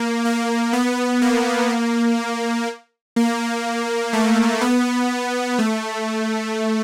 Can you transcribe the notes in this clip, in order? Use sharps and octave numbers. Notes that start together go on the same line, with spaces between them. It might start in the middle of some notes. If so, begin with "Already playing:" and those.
Already playing: A#3
A#3
B3
A#3
A#3
A3
B3
A3